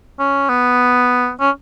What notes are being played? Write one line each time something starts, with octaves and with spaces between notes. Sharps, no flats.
C#4
B3
C#4